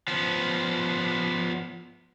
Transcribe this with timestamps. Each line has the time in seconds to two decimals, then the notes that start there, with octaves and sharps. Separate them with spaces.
0.08 F3 B3